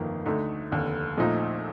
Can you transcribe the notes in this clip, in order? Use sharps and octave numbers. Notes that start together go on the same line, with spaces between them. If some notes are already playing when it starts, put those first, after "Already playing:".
Already playing: G1 F2 D#3 A#3
D2 D3 A3 D#4
F1 D#2 D3
A#1 A#2 F3 A3 D#4